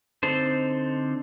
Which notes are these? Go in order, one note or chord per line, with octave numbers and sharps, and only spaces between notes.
D3 C4 D#4 A4 C5